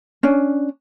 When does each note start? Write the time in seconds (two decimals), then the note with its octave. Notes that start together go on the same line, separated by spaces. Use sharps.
0.23 C#4 D4